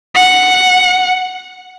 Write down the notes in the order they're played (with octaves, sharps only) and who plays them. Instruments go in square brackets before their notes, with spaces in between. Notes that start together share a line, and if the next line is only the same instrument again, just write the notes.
[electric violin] F#5